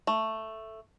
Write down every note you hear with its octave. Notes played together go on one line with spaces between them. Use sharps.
A3